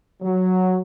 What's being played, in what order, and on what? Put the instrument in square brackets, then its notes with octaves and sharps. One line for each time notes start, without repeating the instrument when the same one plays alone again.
[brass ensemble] F#3